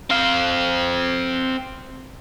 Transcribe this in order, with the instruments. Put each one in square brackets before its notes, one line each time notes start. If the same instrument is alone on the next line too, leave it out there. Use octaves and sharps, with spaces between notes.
[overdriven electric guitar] C4 F5